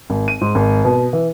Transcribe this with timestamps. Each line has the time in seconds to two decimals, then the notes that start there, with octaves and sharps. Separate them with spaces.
0.10 G#1
0.28 D#7
0.41 G#2
0.55 G#1
0.84 B2
1.13 E3